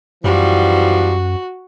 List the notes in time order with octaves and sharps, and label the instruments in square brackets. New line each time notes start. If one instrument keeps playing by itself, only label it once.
[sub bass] F#2 [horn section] E3 F3 G3 [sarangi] F#4